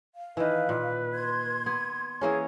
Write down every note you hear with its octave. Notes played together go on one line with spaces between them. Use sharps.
F5
D#3 E3 B4
A#2
C6 G#6
B3
E3 A#3 C#4 G#4